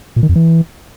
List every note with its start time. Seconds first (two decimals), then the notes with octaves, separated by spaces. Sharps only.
0.16 A#2
0.23 D#3
0.29 F2
0.36 E3